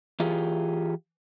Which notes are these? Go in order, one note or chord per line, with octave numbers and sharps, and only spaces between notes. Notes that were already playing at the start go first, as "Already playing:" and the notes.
E3 F4 G4 G#4